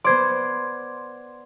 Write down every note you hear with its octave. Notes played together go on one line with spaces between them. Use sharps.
B3 C5 D5 C6 G#6